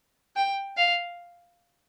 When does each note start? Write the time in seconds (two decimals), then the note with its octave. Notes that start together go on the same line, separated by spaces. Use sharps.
0.36 G5
0.77 F5